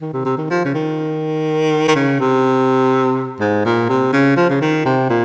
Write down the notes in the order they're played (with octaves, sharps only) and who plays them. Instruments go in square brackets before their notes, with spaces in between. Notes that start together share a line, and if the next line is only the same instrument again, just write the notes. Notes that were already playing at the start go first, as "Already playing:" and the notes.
[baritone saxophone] D#3
C3
C3
D#3
F3
C#3
D#3
D#3
C#3
C3
G#2
A#2
C3
C#3
F3
C#3
D#3
C3
A#2